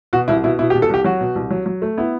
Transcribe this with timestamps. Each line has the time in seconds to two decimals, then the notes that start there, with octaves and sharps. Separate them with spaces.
0.13 B2 F#4
0.28 C2 E4
0.44 B2 E4
0.59 B2 E4
0.70 G4
0.75 B2
0.82 A4
0.89 C2 G4
1.04 F#3 F#4
1.21 B2
1.35 C2
1.51 F#3
1.66 F#3
1.82 A3
1.98 B3 E4